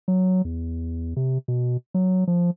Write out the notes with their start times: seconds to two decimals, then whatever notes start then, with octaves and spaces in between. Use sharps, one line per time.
0.08 F#3
0.45 E2
1.17 C3
1.48 B2
1.94 F#3
2.28 F3